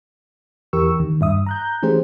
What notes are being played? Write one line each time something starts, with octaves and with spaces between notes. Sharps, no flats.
E2 E3 G4 A#4 C#6 E6
D#2 D#3
G2 E5 D#6
A#5 F#6 G6
E3 A3 C#4 G4 G#4 C5